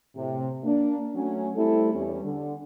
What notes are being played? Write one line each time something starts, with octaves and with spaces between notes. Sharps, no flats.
A2 C3
A#3 D4
F#3 A3 C#4
G3 A3 C4 E4 A4
E2 G3 C#4
D3